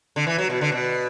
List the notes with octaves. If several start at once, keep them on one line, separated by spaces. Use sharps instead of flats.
D3
E3
F#3
B2
D3
B2